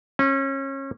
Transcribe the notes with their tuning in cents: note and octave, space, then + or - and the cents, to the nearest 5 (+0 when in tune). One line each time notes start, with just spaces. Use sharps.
C#4 -30